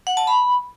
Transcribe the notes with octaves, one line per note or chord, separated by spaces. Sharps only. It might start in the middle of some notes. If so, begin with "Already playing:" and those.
F#5
A5
B5